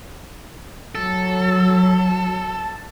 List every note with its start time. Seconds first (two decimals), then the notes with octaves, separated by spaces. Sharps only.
0.95 F#3 A4